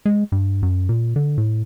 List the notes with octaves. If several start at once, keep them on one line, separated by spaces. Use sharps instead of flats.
G#3
G2
F#2
A#2
D3
A2